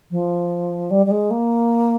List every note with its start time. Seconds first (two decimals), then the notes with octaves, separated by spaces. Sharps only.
0.11 F3
0.91 G3
1.06 G3
1.11 G#3
1.31 A#3